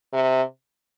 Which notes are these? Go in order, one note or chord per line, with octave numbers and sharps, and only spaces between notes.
C3